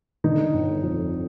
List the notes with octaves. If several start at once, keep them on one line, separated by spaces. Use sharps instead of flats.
D3 D#4
G1
F2